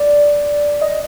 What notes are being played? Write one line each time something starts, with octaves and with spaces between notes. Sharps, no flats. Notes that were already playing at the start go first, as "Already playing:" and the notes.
Already playing: D5
D#5